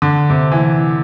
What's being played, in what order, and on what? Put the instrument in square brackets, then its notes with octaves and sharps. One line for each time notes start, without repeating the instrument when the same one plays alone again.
[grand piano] D3
C3
E3